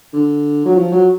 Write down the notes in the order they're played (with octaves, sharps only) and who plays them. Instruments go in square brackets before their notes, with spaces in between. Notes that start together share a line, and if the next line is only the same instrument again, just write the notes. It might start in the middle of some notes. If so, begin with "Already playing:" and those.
[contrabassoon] D3
F#3
F3
F#3